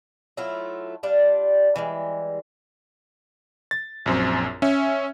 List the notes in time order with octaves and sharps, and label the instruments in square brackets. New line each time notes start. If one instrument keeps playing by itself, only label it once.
[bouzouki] F#3 A3 E4 F4
G3 D4 F4
E3 G3 G#3
[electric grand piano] A6
A#1 F#2 C4
C#4 E5